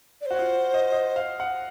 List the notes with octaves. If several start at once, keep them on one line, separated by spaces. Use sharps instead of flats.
D5
F#4 C5
F4
D#5
D#5
F5
F#5